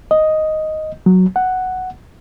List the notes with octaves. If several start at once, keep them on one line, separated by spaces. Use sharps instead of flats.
D#5
F#3
F#5